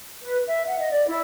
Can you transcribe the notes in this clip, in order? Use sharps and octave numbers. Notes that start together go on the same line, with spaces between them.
B4
E5
F#5
D#5
D5
E4